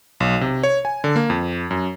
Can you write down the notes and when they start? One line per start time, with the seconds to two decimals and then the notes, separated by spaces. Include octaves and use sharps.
0.20 B1
0.41 C3
0.63 C#5
0.85 G#5
1.04 D3
1.16 A#3
1.30 F2
1.71 F#2